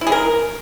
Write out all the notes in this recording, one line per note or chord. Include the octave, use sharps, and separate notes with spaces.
E4
G#4
A#4